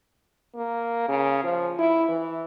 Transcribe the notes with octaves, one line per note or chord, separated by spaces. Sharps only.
A#3
C#3
F3
E4
E3